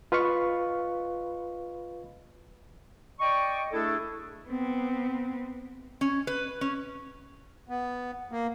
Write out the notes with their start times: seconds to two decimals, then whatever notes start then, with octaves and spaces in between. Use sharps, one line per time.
0.12 F4 B4 D#5 F5 B5 C#6
3.20 D5 D#5 G5 C#6
3.72 A3 D4 E4 G#4 A4
4.48 B3 C4
6.01 C#4
6.27 B4
6.61 C#4
7.69 B3
8.32 A#3